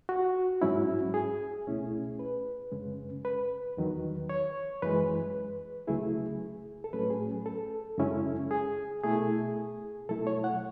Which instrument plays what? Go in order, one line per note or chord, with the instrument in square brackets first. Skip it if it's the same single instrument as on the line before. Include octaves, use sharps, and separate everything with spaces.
[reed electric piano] F#4
G#2 F#3 C#4 E4
G#4
C#2 B2 A3 C#4 E4
B4
F#2 C#3 G#3 C#4
B4
E2 D#3 F#3
C#5
F#2 E3 G#3 B4
C#2 C#3 F#3 A3 E4 G#4
A4
A2 F#3 A3 C#4 B4
G#4
A4
F#2 C#3 G#3 C#4 E4
G#4
B2 A3 E4 G#4
B2 F#3 A3 E4 A4
C#5
F#5